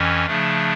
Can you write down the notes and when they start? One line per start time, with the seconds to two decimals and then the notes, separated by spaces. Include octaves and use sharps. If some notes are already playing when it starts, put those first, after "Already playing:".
Already playing: F2 E3 C#4
0.26 C#3 F3 A3 D4